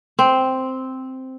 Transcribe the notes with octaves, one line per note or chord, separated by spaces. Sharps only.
C4